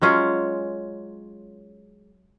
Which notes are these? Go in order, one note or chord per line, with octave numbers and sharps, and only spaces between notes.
F#3 G#3 C#4 F4